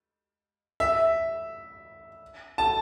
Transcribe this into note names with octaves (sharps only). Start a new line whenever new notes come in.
E5
A5